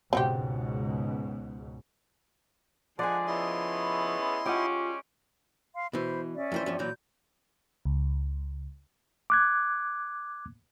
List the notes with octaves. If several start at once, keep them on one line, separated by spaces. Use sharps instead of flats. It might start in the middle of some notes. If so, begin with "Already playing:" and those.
C#2 G#2 B2 C4 F#4 G4
D3 F3 G#3 D5 F#5 G#5
C#3 A3 B3 E4 D#5 C6
G#3 C#4 F4 G4 F#5 G5 D6
F5 C6
B2 E3 C5 B5
C#4 D5 E5
F2 E3 C5
E2 G2 F3
A#2 E3 F#3 G6
C#2
D6 F#6 G#6